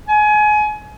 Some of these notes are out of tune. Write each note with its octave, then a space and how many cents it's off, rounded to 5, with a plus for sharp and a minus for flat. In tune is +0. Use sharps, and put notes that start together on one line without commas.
G#5 +25